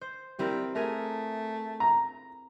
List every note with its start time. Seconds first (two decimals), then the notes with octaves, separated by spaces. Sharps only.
0.01 C5
0.39 G3 C4 E4 A#4
0.75 A3 G#4 A#4
1.80 A#5